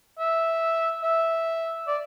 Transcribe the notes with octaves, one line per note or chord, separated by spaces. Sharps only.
E5
E5
D5